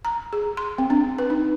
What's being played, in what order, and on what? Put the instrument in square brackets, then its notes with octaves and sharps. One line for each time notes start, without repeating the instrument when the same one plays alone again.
[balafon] A#5
G#4
C6
C4
D4
B4
D#4